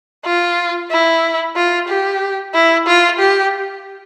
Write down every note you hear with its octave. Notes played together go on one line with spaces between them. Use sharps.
F4
E4
F4
G4
E4
F4
G4